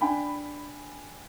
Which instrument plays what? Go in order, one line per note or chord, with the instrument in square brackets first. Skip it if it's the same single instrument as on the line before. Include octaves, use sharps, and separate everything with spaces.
[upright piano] D4 G5 G#5 B5